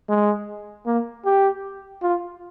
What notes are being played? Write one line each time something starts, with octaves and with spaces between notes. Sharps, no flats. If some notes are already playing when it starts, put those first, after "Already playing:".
G#3
A#3
G4
F4